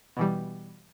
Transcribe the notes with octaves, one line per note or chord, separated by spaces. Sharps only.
B2 E3 G3